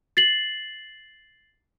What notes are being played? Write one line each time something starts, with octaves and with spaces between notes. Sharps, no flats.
A6 C7 F#7